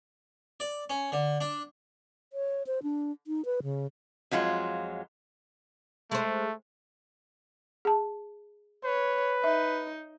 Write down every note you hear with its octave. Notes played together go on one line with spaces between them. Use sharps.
D5
C#4
D3
D4
C#5
C5
D4
D#4
B4
C#3
F2 F#3 G#3 F4
G#3 A3 C5
G#4 A5
B4 C#5
D#4 E5